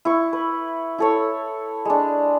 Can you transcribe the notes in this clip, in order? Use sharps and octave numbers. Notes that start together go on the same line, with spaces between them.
E4 C#6
B4
E4 A4 C#5
G#3 D4